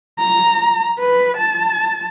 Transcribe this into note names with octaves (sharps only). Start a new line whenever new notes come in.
A#5
B4
A5